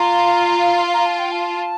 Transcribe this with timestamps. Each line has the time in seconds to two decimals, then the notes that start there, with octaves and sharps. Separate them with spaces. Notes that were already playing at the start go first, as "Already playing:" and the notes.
Already playing: F4 A#5
0.93 A#5
1.05 A5
1.19 G5
1.31 A5